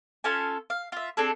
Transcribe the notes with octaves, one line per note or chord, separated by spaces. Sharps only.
C#4 F4 A4 G#5
F5
F4 E5
C4 D4 G#4 A4